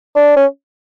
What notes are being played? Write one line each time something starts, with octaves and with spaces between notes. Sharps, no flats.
D4
C#4